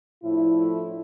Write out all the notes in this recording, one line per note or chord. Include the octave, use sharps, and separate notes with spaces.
A2 F3 A3 D4 E4